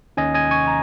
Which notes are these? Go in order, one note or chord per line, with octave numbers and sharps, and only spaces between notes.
D#2 D#3 C#4 D#5 G#5
D#5 G#5
G#5 C#6
A#5